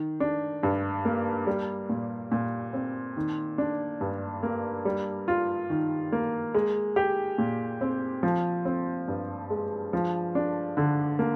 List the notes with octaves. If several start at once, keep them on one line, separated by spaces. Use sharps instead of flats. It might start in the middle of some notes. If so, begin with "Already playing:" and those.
Already playing: D#3
D4
G2
A#3
G3
A#2
A#2
C4
D#3
D4
G2
A#3
G3
F4
D#3
A#3
G#3
G4
A#2
C4
F3
C4
G2
G#3
F3
D4
D3
A#3